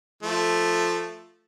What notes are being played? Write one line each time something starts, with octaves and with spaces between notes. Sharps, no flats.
F3 A3